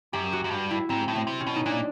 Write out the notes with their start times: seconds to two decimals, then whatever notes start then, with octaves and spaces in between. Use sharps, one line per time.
0.13 F#2 G4
0.33 F#4
0.44 F#2
0.51 G2
0.71 E4
0.89 G#2 C4
1.08 A2
1.15 C4
1.27 C3
1.40 C#4
1.47 B2
1.56 D#4
1.66 A#2 D4